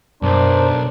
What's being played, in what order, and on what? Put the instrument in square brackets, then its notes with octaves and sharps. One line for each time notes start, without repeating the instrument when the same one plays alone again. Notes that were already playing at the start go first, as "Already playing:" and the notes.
[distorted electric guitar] B1 [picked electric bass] F#2 [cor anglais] D4 [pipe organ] A#4 C5